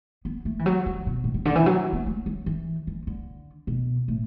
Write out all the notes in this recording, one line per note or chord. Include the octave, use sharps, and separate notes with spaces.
B3
A3
E3
F#3
E3
B2
A2
B2
D3
E3
F#3
B3
A3
F#3
E3
E3
D3
B2
A2